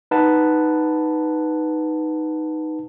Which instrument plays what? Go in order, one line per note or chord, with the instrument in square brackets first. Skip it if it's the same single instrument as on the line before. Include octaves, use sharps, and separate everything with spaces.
[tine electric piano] D#4 B4 F#5 A5